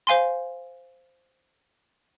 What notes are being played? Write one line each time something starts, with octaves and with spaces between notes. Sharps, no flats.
C5 F5 G#5 C6